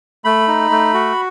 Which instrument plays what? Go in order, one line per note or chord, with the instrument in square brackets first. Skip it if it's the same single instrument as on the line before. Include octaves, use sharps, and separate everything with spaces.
[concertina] A3 B5
D#4
A3
F#4